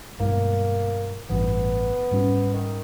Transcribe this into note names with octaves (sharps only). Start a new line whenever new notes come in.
G2 B2 G#3 A#3
A1 G2 B3
G#2 G3 C#4
D#3